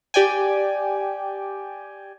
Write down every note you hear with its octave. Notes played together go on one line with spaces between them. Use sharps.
G4 D5 G5 G#5